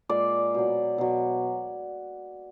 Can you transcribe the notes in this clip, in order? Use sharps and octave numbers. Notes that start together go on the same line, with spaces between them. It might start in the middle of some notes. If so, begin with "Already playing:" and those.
A#2 G#3 D5
B2 F#3
B2 F#3